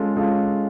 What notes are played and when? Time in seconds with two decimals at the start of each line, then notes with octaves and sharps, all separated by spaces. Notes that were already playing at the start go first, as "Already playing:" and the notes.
Already playing: G#3 C#4 F4 A4
0.17 G#3 C#4 F4 A4